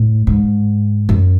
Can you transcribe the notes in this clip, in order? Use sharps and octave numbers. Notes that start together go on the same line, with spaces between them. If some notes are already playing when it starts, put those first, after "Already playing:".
Already playing: A2
G#2
F#2